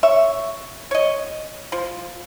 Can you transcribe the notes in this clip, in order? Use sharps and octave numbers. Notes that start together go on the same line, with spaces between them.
C#5 E5
C#5 D#5
F3